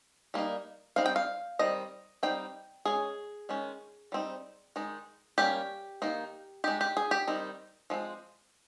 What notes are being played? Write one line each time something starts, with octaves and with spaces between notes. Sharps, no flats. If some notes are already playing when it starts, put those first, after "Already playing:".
G3 A#3 D#4
G3 C4 D#4 F5
G5
F5
D#3 G3 C4 D#5
G3 C4 D#4 G5
G#3 C#4 G#4
D#3 G#3 C#4
G3 C4 D#4
D#3 G#3 D#4
G3 A#3 C#4 G4
D#3 A#3 D#4
G#3 D#4 G4
G4
G#4
G4
D#3 G3 C4 D#4
F3 G#3 C4